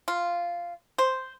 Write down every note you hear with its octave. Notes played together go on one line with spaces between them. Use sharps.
F4
C5